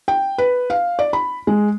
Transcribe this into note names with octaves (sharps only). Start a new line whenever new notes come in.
G5
B4
F5
D5
B5
G#3